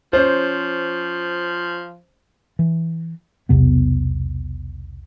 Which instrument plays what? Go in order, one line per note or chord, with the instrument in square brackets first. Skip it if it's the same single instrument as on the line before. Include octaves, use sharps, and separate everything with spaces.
[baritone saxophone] F3 [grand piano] C#4 C5
[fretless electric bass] E3
B1 E2 C3 B3